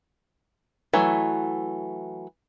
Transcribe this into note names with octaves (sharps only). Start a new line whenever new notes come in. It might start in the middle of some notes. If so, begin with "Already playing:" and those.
E3 F#3 A3